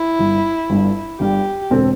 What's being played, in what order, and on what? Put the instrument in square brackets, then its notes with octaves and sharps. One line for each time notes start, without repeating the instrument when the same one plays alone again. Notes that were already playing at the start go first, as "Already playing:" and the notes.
Already playing: [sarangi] E4
[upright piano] G1 G2 G3
G1 G2 G3
[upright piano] G1 G2 G3 [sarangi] G4
[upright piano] E1 D3 C4 A4